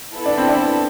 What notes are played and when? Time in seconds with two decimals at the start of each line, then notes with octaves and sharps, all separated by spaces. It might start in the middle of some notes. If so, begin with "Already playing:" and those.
0.14 B3 E4 A4
0.26 D4
0.38 C4
0.49 D4